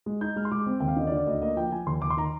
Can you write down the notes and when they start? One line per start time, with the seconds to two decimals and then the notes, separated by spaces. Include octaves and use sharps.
0.06 G#3
0.21 D#4 G6
0.36 G#3 F6
0.45 C6
0.52 G#3 D6
0.66 C4
0.80 D#2 G5
0.88 F5
0.96 D3 D#5
1.07 D5
1.12 D3
1.17 D5
1.27 D2 D#5
1.42 A#3 D#5
1.56 F3 G5
1.71 F3 G#5
1.86 D#2 C6
2.02 D#2 D6
2.10 C6
2.17 D#3 A#5